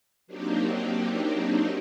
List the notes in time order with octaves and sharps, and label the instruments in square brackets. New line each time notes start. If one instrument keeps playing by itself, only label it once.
[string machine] F#3 A#3 C4 D4 D#4 G4